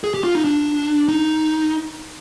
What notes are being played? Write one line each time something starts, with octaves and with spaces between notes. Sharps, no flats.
G#4
G4
F4
D#4
D4
D#4